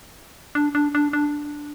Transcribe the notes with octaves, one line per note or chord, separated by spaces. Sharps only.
D4
D4
D4
D4